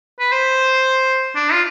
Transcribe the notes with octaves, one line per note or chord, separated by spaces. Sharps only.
B4
C5
D4
F4